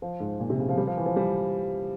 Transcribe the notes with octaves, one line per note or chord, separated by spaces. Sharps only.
F3
G#2
A#2
C3
C#3
F3
G3
F3
E3
F3
G3